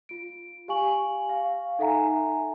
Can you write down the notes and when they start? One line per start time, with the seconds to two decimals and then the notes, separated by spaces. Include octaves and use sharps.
0.09 F4 D7
0.68 G4 F5 G#5 C#6 F#7
1.29 F5
1.79 D#4 A4 E5 F#5 G#5 A#5